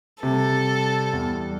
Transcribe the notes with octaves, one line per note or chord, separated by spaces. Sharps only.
C3 G3 A4
E2